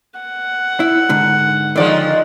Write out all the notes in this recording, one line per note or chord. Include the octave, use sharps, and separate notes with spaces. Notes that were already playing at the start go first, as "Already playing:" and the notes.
F#5
E4
G#2 D3
D3 D#3 F3 G#3 D5